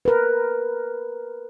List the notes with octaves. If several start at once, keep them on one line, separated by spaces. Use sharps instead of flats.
A#4 B4